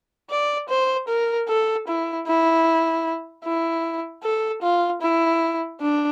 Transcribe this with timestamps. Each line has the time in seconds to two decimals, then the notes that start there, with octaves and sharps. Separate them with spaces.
0.30 D5
0.69 C5
1.08 A#4
1.48 A4
1.88 E4
2.27 E4
3.45 E4
4.24 A4
4.62 F4
5.02 E4
5.81 D4